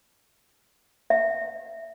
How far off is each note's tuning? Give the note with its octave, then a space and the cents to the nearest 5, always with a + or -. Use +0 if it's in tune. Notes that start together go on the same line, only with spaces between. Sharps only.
E5 +5